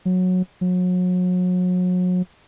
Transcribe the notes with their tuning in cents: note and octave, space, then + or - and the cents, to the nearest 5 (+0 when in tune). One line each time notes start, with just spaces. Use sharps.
F#3 -15
F#3 -35